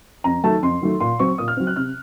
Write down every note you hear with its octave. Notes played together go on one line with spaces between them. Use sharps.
F2 A#5
D#3 F#3 A3 A5
F2 C6
D#3 F#3 A3
A#2 C6
F#3 C4 C#6
A#2 D#6
F6
F#3 C4
F#6
C3 F6